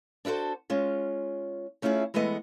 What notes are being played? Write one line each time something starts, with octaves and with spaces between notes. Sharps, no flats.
D4 E4 F#4 A4 C5
G#3 C#4 F4
A3 C#4 E4 F4 G4 G#4
E3 G#3 A3 B3 D#5